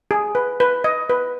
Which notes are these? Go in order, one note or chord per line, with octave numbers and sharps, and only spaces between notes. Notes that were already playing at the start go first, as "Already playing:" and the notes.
G#4
B4
B4
D#5
B4